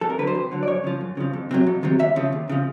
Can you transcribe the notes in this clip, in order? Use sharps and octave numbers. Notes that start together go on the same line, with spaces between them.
F2 A4
A#4
D3 F#3 B4
C5
F2
D3 F#3
D5
F#2 C#5
C#3 F3
F#2
C#3 F3
F2
C3 D#3 F#3
F2
C3 D#3 F#3
D#2 E5
C#3 F3
D#2
C#3 F3